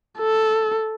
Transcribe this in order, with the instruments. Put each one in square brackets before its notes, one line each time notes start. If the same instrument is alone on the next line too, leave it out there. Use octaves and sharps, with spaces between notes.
[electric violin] A4